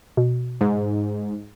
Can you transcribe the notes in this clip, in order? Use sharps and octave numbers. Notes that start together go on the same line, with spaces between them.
B2
G#2